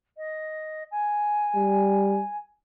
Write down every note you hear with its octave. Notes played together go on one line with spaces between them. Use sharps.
D#5
G#5
G3